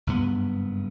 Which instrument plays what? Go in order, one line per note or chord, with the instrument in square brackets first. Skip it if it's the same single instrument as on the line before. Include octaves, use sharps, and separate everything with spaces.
[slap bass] F#1 G2 B3